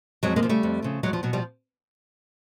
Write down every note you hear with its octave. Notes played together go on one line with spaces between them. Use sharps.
F2 F#3 G#3
G#3 A#3
C#3 F3
G3 A3
F2
C#3 F3
E2 F#3 G#3
F3
B2 F#3
F3 G3